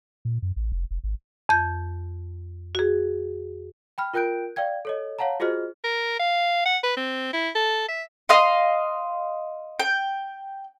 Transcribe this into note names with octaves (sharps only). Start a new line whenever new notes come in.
A#2
F#2
A1
F1
F1
G#1
F2 G6
F#4 G#4
G5 B5 F6
F4 A#4 G5 F#6 G6 D7
D5 F5 G5 G#6
A4 C#5 D#5
C#5 F5 F#5 A5 A#5
F4 F#4 G#4 C5 D#5 F6
A#4
F5
F#5
B4
C4
E4
A4
E5
D#5 F5 C6
G5